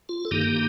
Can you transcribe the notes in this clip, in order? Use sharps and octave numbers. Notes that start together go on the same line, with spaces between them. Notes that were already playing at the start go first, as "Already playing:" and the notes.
F4
A4
G2 D#3 A#3 D#4 G4